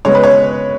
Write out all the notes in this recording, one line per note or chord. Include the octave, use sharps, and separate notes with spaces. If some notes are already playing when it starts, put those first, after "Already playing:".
C#3 G#3 B3 C#5
B4
C#5